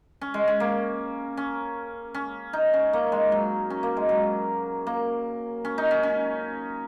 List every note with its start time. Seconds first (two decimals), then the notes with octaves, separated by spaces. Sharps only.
0.21 C#4
0.34 G#3
0.48 C#4
0.60 A#3
1.37 C#4
2.14 C#4
2.53 D#4
2.74 C#4
2.93 A#3
3.12 G#3
3.32 F#3
3.70 C#4
3.83 A#3
3.97 G#3
4.09 F#3
4.87 A#3
5.65 C#4
5.78 D#4
5.91 C#4
6.03 C#4